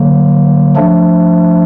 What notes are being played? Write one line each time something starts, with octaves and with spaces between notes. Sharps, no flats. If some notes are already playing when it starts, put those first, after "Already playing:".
Already playing: D3 F#3 A#3
F3 A3 D4